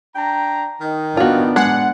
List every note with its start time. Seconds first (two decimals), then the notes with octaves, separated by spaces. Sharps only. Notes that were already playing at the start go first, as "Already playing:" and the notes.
0.16 D4 G5 A#5
0.81 D#3 D#4
1.17 B3 D4 F4 F#4
1.56 G#3 F#5